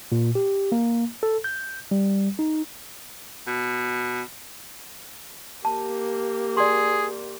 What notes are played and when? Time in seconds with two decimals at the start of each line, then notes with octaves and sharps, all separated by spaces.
0.12 A#2
0.35 G4
0.72 A#3
1.23 A4
1.44 G6
1.91 G3
2.39 D#4
3.47 B2
5.65 A#3 G4 A5
6.57 G#4 D5 C6